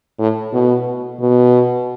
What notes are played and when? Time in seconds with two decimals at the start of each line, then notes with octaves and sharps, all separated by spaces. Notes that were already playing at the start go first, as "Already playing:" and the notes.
0.19 A2
0.53 B2
1.21 B2